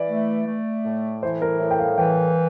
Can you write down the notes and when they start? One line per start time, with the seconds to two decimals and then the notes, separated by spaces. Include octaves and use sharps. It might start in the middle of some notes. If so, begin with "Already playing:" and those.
Already playing: E3 D5
0.10 A3
0.47 A3
0.85 A2
1.23 E3 C5
1.42 A#4
1.60 A2
1.71 G5
1.79 F5
1.98 E3 G5